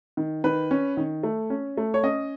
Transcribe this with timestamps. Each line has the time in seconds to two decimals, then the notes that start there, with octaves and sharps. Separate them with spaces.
0.17 D#3
0.44 D#3 B4
0.71 C#4
0.97 D#3
1.23 A3
1.50 C#4
1.77 A3
1.94 C#5
2.03 C#4 D#5